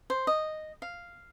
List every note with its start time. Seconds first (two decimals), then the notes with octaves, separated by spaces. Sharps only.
0.10 C5
0.27 D#5
0.82 F5